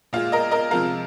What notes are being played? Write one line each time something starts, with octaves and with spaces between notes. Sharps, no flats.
A#2 G#3 F4
A#4 D#5
A#4 D#5
C3 F3 G#3 F4 A#4